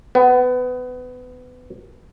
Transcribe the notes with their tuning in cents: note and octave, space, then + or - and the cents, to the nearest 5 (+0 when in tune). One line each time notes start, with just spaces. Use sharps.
B3 +25